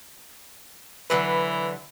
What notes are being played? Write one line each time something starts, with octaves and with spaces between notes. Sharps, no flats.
D3 E3 F#3 B4